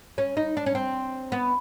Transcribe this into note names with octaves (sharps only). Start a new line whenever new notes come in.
C#4
D#4
D4
C#4
C4
B3